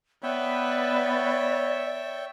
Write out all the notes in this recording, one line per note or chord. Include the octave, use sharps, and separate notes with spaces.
B3 B4 C#5 D5 E5 G5